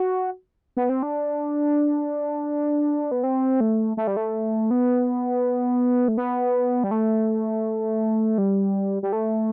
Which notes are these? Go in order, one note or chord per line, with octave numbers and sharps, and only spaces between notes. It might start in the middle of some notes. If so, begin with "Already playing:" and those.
Already playing: F#4
B3
C4
D4
B3
C4
A3
A3
G3
A3
B3
A3
B3
G3
A3
G3
G3
A3